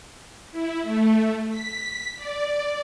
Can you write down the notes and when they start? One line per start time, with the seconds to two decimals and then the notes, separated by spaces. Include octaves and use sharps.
0.51 E4
0.83 A3
1.49 B6
2.16 D5